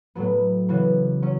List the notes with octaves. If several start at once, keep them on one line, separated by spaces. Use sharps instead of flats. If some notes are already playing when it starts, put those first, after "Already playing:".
A2 F#3 B3
C#3 E3 B3 F#4
F#3 C#4